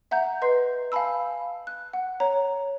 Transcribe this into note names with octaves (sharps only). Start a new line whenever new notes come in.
E5 F#5 A#5 G6
B4 D#5 C6 G6 C7
F5 G#5 A5 B5 E6
F#6
F#5
C#5 A#5